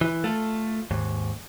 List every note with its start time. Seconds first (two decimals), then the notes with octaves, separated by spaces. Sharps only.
0.01 E3
0.24 A3 F4 A4
0.91 D#2 G#2